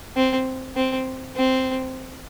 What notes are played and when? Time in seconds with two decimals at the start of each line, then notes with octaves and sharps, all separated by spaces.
0.16 C4
0.76 C4
1.37 C4